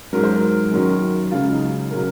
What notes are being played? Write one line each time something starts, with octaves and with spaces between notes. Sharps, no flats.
G#2 F#3 A#4
C5
A#4
F#2 D#3 F#3
C#2 C#3 F#3 F4
D#4
C#3 F#3 A#4